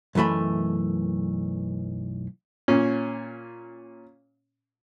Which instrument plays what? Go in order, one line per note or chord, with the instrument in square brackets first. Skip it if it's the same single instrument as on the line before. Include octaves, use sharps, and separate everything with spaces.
[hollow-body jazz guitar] B1 F#2 E3 A3 B5
[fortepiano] A#2 C#4